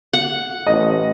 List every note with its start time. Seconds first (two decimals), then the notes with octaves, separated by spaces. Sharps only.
0.13 F#5
0.67 A1 D#5